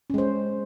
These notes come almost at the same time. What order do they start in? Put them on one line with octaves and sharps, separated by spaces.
C#4 G#3 C5